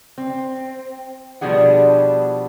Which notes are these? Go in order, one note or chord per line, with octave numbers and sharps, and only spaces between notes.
C4
B2 F3 G3 D4 G#4 F#5